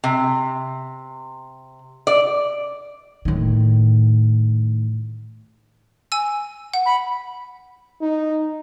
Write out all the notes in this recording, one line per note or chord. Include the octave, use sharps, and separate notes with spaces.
C3
D5
A2 D#3
G#5 E6
F#5
B5
D#4